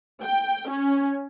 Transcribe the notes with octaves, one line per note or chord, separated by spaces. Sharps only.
G5
C#4